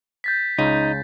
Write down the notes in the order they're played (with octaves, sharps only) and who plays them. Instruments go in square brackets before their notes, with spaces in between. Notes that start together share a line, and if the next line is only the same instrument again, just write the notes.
[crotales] G6 A6 B6
[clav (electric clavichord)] C#2 C#3 [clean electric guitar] D#4